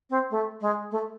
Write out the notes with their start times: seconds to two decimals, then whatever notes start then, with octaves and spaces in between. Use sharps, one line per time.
0.10 C4
0.31 A3
0.61 G#3
0.91 A3